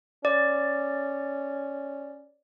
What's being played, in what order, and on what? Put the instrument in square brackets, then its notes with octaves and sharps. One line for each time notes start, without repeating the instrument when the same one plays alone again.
[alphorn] C#4 [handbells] D5